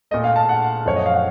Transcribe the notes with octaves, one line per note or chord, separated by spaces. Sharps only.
A#2 A3 D#5
F5
A5
F#5
F#2 F3 A3 C#5
D#5
F5
F#5